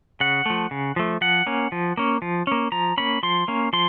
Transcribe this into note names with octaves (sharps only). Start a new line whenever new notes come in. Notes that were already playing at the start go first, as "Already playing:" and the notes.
C#3 F#5
F3 A3
C#3
F3 A3
F3 F#5
A#3 C#4
F3
A#3 C#4
F3
A#3 C#4
F3 A#5
A#3 C#4 B5
F3 C6
A#3 C#4
F3 C6